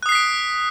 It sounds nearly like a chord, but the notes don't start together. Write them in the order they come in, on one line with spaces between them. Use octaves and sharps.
F#6 D#6 C7 B6 D7